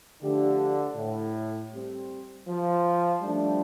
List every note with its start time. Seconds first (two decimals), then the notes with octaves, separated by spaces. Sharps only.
0.22 D3 F3 A3 D4 G4
0.97 A2
1.73 G3 C4 G4
2.48 F3
3.23 F3 G3 A3 D4